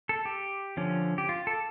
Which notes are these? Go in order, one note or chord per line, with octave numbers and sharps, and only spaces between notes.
A4
G4
D3 F3 C#4
G4
F4
A4